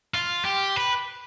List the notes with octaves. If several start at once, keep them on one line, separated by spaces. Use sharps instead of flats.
F4
G4
B4